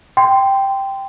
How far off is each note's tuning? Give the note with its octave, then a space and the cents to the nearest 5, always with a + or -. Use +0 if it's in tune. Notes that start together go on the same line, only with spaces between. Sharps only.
G5 +0 C6 -15